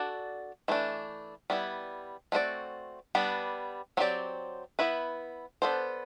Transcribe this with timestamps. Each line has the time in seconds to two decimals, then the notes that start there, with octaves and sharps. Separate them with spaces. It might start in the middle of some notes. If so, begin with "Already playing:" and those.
Already playing: D4 F#4 A4 D5
0.68 E3 A3 D4
1.50 G3 B3 E4
2.32 A3 C4 F#4 B4 D5
3.15 G3 B3 D4
3.97 F#3 C4 G4 D5
4.79 B3 E4 B4
5.62 B3 D4 A4 C5